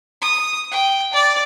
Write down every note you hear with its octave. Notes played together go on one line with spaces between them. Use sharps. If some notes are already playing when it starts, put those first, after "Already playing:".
D#6
G5
D5